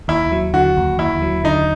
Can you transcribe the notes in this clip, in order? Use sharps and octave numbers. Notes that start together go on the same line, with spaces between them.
D#2 E4
F#3
D3 F#4
D#2
D#2 E4
F#3
D3 D#4